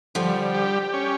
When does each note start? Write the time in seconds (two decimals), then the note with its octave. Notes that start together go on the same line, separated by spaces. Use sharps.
0.15 D3 F3 G3
0.54 G4
0.93 C#4